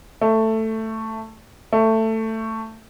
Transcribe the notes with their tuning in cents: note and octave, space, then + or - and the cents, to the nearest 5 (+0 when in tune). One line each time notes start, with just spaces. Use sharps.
A3 +10
A3 +15